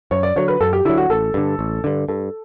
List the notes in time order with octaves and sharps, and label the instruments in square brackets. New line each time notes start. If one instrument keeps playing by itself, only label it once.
[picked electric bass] F#2 [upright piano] C#5
[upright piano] D5
[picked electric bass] D3 F#3 [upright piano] C#5
[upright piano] B4
[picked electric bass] F#2 [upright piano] A4
[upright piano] G4
[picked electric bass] D3 [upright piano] E4
[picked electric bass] F#3
[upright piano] F#4
[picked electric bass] A1 [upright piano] A4
[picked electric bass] G2 D3
A1
G2 D3
[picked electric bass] G2 [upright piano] A4